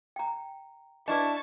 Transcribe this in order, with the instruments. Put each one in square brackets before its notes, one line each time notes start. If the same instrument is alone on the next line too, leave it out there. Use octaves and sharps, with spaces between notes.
[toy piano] G5 A#5
[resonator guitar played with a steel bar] D4 E4 [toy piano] B4 D#5 [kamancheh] A5 C#6